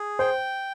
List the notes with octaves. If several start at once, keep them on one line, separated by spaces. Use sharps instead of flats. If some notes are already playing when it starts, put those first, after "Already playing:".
Already playing: G#4
C5 G5